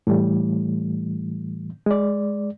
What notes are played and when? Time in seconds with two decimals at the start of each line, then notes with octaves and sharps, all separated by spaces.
0.07 A2 E3 G3 A3
1.86 G#3 D5